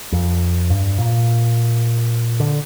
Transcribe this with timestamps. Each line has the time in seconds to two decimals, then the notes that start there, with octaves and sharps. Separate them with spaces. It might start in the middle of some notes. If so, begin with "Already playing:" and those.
0.12 F2
0.70 G2
0.98 A#2
2.40 D3